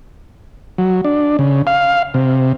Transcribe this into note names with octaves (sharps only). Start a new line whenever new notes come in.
F#3
D4
C#3
F5
C3